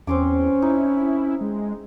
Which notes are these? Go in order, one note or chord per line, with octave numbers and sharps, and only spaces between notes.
E2 C4 C#4 C6 D6
D#4 E4
G#3